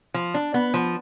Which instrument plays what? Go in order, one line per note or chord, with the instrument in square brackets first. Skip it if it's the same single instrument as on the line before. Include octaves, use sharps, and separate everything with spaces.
[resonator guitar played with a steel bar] F3
D4
B3
F3